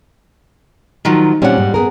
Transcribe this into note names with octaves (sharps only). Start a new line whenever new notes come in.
D#3 F3 F#3
A#2 G3 C4 C#4 F#5
G#2
B3 G#4 A#4